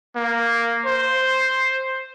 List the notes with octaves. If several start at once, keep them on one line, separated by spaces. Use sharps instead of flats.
A#3
C5